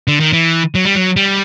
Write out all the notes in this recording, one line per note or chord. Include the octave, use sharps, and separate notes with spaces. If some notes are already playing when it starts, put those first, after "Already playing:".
D3
D#3
E3
F#3
G3
F#3
G3